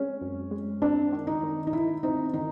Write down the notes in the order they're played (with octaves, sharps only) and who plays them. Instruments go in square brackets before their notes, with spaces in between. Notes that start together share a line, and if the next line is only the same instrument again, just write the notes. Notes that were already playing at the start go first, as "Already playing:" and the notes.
Already playing: [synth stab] G#3 C4 [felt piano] C#4
[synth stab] F#2
G#3
[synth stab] C4 [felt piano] D4
[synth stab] D#3
[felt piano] D#4
[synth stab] D#3
[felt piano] D#4
[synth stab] D#3 [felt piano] E4
[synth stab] C4 [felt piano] D#4
[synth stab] D#3 [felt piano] D#4